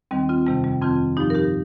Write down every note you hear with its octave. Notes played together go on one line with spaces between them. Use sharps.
D#2 D#3 G3 C4
C4 F4
F2 C3 D#3 G3
G3
F2 D#3 C4 F4
G2 F3 D#4 G4
A#4
D#4 G4